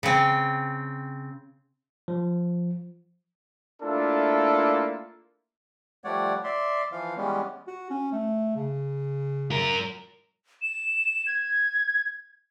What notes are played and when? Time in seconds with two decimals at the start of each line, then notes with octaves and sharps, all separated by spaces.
0.03 C#3 C4
2.08 F3
3.82 A3 A#3 D4 E4 F4 A4
6.04 F3 G3 A3 C#5 D5 F#5
6.44 D5 E5 C6
6.92 E3 F3 F5
7.16 E3 G3 G#3 B3 C#4
7.68 F#4
7.90 C#4
8.12 A3
8.56 C#3
9.51 F#3 A#4
10.62 E7
11.27 G#6